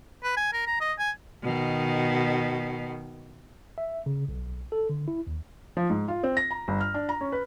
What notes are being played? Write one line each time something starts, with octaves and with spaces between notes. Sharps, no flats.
B4
G#5
A#4
A#5
D#5
G#5
B2 D#3
E5
C#3
B1
A4
D3
E4
D#2
F3
G#2
F4
C4
A#6
A#5
G1
F6
D4
A#5
C#4
B4